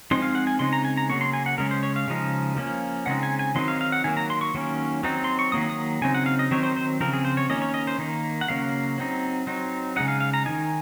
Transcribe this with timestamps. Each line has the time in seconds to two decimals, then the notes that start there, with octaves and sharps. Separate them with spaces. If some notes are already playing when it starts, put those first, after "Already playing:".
0.11 F3 G#3 C4 D#4 C6
0.22 F5
0.35 F#5
0.47 G#5
0.59 C#3 G#3 C4 D#4 C6
0.73 A#5
0.85 G#5
0.97 A#5
1.09 C#3 F#3 A#3 C#6
1.21 C6
1.34 G#5
1.46 F#5
1.58 C#3 G#3 C#4 A#4
1.71 C5
1.83 C#5
1.96 F5
2.08 C#3 F3 G#3 D#4
2.56 F3 A#3 C#4
3.06 C#3 G#3 C4 D#4 F#5
3.23 G#5
3.39 G#5
3.55 D#3 F#3 C4 D#4 C6
3.68 F5
3.81 F5
3.92 F#5
4.04 D#3 F#3 A#3 G#5
4.17 A#5
4.30 C6
4.41 C#6
4.54 D#3 F#3 A#3 C#4
5.03 F#3 C4 D#4
5.24 C6
5.39 C#6
5.52 D#3 F#3 A#3 D#6
5.70 D#6
6.02 C#3 F#3 C4 D#4 G#5
6.14 F#5
6.26 F5
6.39 D#5
6.51 D#3 F#3 C4 D#4 C#5
6.63 C5
6.76 C5
7.01 C#3 F3 C4 A#4
7.13 G#4
7.25 C5
7.37 C#5
7.49 D#3 A#3 C#4 D#5
7.62 C#5
7.74 D#5
7.87 C5
7.99 D#3 A#3 D#4
8.41 F#5
8.48 C#3 F#3 A#3 C#4 F5
8.98 F#3 C4 D#4
9.47 F#3 C4 D#4
9.96 C#3 G#3 D#4 F#5
10.08 F5
10.20 F5
10.34 A#5
10.46 D#3 A#3 D#4 G#5